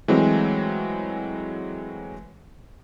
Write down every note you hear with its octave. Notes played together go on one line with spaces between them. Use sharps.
E3 F#3 G#3 A3 C4